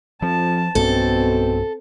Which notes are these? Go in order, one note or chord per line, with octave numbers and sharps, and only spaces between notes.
F2 F3 A5
B1 G2 B2 C4 C#4 A4